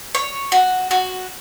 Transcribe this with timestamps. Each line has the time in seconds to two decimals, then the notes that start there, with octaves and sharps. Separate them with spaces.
0.15 C#5
0.52 F#4
0.91 F#4